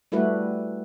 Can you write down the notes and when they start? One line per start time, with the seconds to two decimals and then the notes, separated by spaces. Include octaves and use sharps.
0.12 G3 A3 E4 F#4 B4